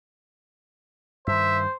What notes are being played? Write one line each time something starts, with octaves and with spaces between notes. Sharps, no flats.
G2 D#3 C5 E5